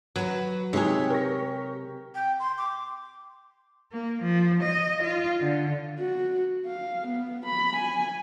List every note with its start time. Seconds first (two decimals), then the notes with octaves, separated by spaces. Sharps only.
0.16 F#3 F#4 B4
0.73 C3 G#3 D#4 G4 G#4 C#5
1.10 A#4 C#6 A#6
2.15 G5
2.40 C6
2.58 D6
3.92 A#3
4.22 F3
4.63 D#5
5.02 F4
5.40 D3
5.99 F#4
6.66 F5
7.07 B3
7.45 B5
7.76 G#5